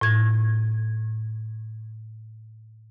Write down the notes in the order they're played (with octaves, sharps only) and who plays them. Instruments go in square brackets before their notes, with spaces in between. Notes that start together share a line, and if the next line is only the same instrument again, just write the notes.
[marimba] A2 G#6